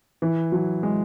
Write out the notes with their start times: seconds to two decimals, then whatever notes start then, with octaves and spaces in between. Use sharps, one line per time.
0.22 E3
0.52 F#3
0.83 G#3